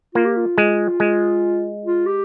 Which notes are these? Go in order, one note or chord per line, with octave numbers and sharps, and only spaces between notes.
A#3 F4
G4
F4
G#3
G#3
F4
G4